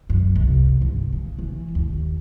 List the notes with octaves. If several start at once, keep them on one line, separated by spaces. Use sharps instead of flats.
F#2
C2
G2
C#3
E3
D#2